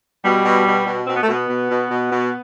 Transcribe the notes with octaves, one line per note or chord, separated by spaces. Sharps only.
B2 G3
B2
B2
B2
B2 C4
B3
A3
B2 B3
B2
B2
B2
B2